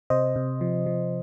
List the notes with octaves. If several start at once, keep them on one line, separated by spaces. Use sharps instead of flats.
C3 C5 D#5
C3
F3
F3